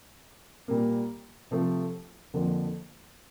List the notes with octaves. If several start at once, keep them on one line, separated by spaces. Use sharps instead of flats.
A#2 G3 A#3
C3 F3 A3
F2 D3 F3 A#3